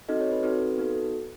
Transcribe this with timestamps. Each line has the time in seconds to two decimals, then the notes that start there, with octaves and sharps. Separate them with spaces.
0.09 C4 D#4 F#4 A4 D#5
0.21 C#5
0.32 B4
0.43 C4 D#4 F#4 A4 B4
0.78 B3 D#4 F#4 A4